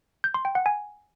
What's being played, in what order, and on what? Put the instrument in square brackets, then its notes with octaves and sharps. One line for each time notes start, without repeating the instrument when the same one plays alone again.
[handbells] G6
C6
G5
F#5
G#5